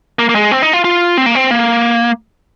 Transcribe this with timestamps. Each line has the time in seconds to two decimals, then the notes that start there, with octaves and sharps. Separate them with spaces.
0.19 A#3
0.29 A#3
0.35 G#3
0.51 C4
0.62 D#4
0.73 F4
0.84 F4
1.17 C4
1.26 A#3
1.35 C4
1.51 A#3